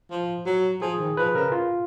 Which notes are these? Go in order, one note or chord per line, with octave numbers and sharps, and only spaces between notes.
F3
F#3
F3 G#4
D#3
F3 B4
C#3 A#4
F4